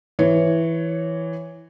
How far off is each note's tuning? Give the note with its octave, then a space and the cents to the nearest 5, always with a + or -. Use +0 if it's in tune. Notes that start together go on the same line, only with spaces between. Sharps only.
E3 +0 C#5 +0